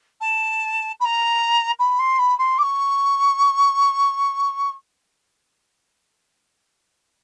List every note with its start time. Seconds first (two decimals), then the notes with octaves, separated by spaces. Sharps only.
0.20 A5
1.00 B5
1.05 A#5
1.79 B5
1.99 C6
2.18 B5
2.38 C6
2.58 D6
2.62 C#6